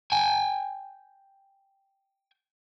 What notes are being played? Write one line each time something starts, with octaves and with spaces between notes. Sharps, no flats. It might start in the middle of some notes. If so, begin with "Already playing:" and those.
G5 G#5